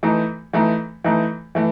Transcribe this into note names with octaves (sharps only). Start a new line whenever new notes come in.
E3 A3 D#4
E3 A3 D#4
E3 A3 D#4
E3 A3